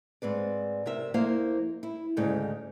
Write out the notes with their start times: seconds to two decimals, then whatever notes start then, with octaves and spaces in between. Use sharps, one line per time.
0.22 G#2 C4 B4 D5
0.86 C3 A#4 E5
1.14 F2 A#3 E4 C5 F5
1.83 E4
2.17 D2 G#2 C#3